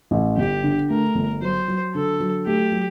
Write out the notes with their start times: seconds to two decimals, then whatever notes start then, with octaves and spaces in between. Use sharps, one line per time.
0.11 A1
0.37 G1 G4
0.64 D3
0.90 A3 A#4
1.15 G1
1.42 F#3 C5
1.68 F#3
1.95 D3 A4
2.20 F#3
2.46 A3 G4
2.72 F#3